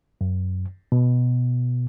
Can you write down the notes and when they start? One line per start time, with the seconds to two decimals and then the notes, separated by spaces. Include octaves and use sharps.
0.21 F#2
0.92 B2